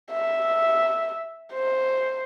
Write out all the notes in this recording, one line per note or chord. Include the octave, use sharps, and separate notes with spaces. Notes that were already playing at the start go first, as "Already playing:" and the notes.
E5
C5